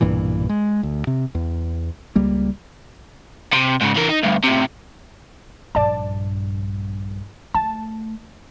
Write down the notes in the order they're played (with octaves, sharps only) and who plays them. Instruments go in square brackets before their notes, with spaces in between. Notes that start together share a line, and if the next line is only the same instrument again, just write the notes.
[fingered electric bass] B1 G2 A#2 E3
G#3
D2
C3
E2
C#2 G3 A#3
[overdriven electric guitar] C3
G#2 C#3
E3 A#4
D#4
D2 G2
A2 C3
[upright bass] A#1 G2 [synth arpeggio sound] D5 A5
[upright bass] A3 [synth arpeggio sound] A5